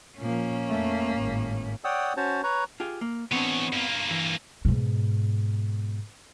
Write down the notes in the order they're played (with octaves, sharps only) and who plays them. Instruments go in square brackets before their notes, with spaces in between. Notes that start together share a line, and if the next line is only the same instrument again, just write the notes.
[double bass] A#2 F3 [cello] A#3 C#4
[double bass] F2 A3
G#1 A2
[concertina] C#5 D5 F#5 G5 D#6 E6
C#4 F#4 C5 C#5 A5
B4 C#5 A#5 C#6
[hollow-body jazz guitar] F4 G4 G#4
A#3
[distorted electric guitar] E3 C#5 [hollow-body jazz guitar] B3 C4 D4
[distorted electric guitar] G2 A#3
[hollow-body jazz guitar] E3
[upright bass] G#2 B2